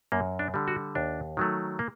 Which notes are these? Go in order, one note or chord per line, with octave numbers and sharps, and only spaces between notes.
F#2 A#3
D4
D3 G3
F#4
D#2 D4
D#3 F#3 A3
A#3